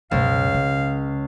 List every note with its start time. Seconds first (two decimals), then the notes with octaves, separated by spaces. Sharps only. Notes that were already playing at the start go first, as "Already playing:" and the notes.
0.11 C#2 F#2 B2 F5
0.54 C#3